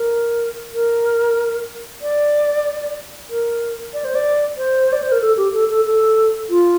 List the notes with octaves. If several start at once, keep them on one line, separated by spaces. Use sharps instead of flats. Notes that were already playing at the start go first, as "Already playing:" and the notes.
Already playing: A#4
A#4
D5
A#4
D5
C5
D5
C5
D5
C5
A#4
A4
G4
A4
A4
A4
F4